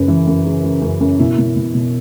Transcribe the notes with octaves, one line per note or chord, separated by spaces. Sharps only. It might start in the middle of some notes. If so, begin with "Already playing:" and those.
Already playing: F#2 C#3 B4
E3
F#2
C#3
C#3
F#2
F#2
B2 E4
B2
B2
B2